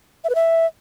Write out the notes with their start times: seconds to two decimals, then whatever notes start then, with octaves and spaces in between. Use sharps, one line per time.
0.24 E5
0.30 B4
0.35 E5